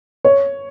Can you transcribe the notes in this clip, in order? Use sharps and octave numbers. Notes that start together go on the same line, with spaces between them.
C#5